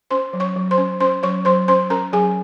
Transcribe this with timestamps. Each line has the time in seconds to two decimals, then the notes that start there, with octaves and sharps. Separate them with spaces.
0.10 C#4 C5 C6
0.33 F#3
0.40 C#5 C#6
0.56 F#3
0.71 C5 C6
0.78 C#4
1.00 C#4 C5 C6
1.23 F#3 C#5 C#6
1.45 F#3 C5 C6
1.68 C#4 C5 C6
1.90 C#4 A#4 A#5
2.13 F#3 G#4 G#5